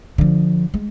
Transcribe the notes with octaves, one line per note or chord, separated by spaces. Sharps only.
D3 F3
G#3